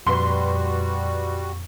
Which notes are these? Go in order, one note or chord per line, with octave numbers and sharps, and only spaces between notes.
F2 A#2 G3 F#4 B4 C6